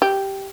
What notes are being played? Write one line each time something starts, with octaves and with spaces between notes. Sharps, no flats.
G4